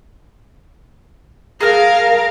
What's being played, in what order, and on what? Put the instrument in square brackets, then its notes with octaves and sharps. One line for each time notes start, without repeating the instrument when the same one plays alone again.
[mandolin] G#4 A5 F6 [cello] A#4 F5